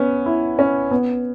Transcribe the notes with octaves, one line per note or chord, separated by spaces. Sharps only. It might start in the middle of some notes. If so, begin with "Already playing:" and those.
Already playing: B3 C#4
E4
C#4
B3